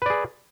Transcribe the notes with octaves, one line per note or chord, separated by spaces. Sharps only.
G#4 B4 D5